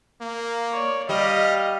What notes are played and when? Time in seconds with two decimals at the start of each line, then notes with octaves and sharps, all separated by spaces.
0.21 A#3
0.71 C#5 D5
1.09 G3 G4 D#5 F5